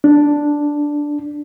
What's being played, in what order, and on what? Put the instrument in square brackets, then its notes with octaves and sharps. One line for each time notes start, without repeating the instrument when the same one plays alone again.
[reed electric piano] D4